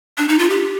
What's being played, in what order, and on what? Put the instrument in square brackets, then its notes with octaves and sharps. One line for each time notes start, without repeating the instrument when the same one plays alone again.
[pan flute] D4
D#4
F4
G4